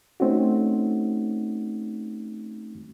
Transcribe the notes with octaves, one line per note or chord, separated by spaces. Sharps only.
A3 C4 C#4 D#4 F#4